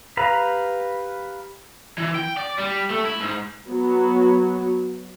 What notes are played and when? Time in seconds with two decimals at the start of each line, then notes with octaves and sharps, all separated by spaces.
0.17 G4 B4 F5 A#5 B5
1.98 E3
2.15 G5
2.37 D5
2.58 G3
2.90 A3
3.06 E4
3.21 G#2
3.68 F#3 B3